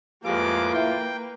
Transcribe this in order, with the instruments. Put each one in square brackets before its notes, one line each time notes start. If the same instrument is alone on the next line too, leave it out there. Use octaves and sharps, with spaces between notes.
[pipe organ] F2 G#3 D6 [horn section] A2 F4 [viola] A#3 B4 [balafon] G4
[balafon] E4 E5 [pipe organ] G5